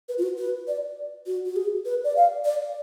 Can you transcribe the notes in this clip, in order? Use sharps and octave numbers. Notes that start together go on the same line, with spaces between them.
B4
F4
F#4
B4
D5
F#4
F#4
G#4
B4
D5
F5
D5